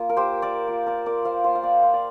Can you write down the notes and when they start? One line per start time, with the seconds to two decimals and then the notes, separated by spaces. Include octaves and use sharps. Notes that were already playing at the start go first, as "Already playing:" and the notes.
Already playing: A#3 F4
0.09 A#4
0.17 G4 C5
0.42 A#4 D5
0.68 A#3 F4
0.86 A#4 D5
1.06 A#4 D5
1.25 C5 F5
1.44 A#3 F4 C5 F5
1.55 F5
1.63 D5 G5
1.83 C5 F5
1.93 D5